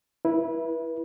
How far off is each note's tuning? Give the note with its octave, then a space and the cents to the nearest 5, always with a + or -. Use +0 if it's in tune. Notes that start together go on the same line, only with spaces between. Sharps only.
E4 +0 B4 -30